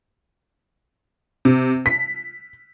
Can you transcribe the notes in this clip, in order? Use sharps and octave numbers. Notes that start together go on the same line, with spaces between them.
C3
B6